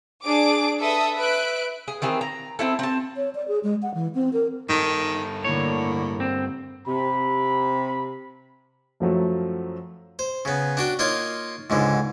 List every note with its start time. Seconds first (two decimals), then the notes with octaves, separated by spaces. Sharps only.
0.23 D4 G#4 D6 D7
0.80 A4 B4 E5 D#6
1.16 B4 E5 F#6 D7
1.88 G#4
2.02 D#3 E3 C4 G#4
2.21 A#5
2.59 C4 E4 A4
2.79 C4 A5
3.17 C#5
3.35 D5
3.48 G#4
3.63 G#3
3.82 F#5
3.94 E3
4.15 C4
4.33 A#4
4.69 G2 D#3 A4
5.44 A2 D3 A#3 C#5
6.20 C4
6.87 C3 B5
9.00 F#2 F3 F#3 A3
10.19 C5
10.45 C#3 B3
10.77 D4 F#4 G5
10.99 A#3 D#4 F4 C#5 C6
11.70 C#2 G#2 D3